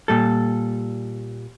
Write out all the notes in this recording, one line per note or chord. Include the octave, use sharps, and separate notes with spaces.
A#2 G3 A4